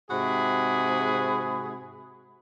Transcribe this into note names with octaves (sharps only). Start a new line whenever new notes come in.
G#2 C3 F#4 G#4 B5